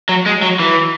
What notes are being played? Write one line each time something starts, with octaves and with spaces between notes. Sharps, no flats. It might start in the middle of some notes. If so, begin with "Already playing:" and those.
F#3
G#3
F#3
E3